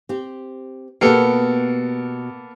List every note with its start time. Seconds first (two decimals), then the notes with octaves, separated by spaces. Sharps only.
0.09 C4 G4
1.01 B2 A#3 B3 G4 A4